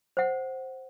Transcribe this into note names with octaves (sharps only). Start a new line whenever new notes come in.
C5 F#5